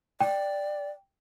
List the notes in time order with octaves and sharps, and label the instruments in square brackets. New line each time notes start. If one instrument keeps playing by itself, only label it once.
[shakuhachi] D5 [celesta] G5